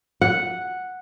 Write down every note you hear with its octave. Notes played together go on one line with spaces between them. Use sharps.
F#5